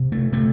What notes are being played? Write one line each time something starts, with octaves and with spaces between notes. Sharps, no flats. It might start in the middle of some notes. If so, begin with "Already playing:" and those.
Already playing: C3
A3
C3 A3